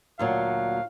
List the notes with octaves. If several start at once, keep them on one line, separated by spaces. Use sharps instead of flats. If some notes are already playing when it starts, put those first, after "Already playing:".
D2 A#2 F#3 F5